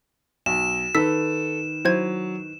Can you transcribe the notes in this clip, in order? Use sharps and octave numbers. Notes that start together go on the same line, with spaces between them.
B1 E7
D#3 D#4 A4 B4 E6 B6
F#3 E4 C5 G#6